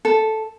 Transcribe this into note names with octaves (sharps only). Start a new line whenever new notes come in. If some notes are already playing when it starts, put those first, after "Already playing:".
A4